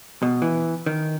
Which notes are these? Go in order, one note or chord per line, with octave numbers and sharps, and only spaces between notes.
B2
E3
D#3